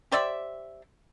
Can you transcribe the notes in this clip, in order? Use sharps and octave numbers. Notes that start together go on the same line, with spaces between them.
G4 C5 D5 E5